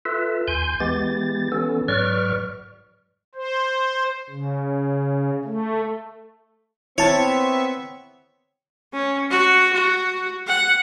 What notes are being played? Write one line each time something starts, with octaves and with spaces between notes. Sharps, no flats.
F4 A4 B4 E5
D#2 G#5 C6 G6
E3 G#3 B3 G4 A6
E3 B3 C#4 A4
G#2 F#3 B4 D5 C#6 F6
C5
C#3
A3
B3 C4 E4 C#5 E5 A5 C#6
C#4
F#4
F#4
F#5